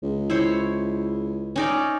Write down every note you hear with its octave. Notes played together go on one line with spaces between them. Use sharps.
C#2
E4 C5 C#5
C#4 D#4 D5